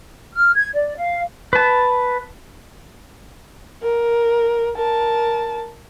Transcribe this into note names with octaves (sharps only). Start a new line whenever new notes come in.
F6
G#6
D5
F5
B4 A5
A#4
A#4 A5